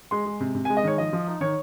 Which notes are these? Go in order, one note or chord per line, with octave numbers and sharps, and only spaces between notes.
G#3 C6
G#3
C3
C3
G#5
G#3
D#5
D#3 C#5
F3 D#5
F3
D#4
D#3 C#5